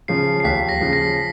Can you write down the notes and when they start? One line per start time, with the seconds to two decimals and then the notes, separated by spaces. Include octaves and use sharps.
0.08 C#3 F3 C7
0.40 C7
0.44 D#2 B6
0.69 A#6
0.81 C#3 F3
0.93 A#6